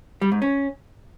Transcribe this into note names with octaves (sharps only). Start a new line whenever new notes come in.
G3
G#2
C#4